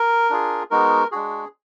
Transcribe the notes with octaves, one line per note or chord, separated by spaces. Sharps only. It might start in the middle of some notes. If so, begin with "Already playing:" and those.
Already playing: A#4
D4 F4 G#4
G#3 B3 D#4 F#4 A#4
G#3 D4 F#4 G#4